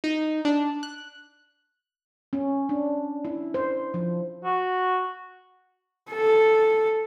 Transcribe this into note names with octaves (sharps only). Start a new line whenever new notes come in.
D#4
D4
F#6
C#4
D4
E4
C5
F3
F#4
A4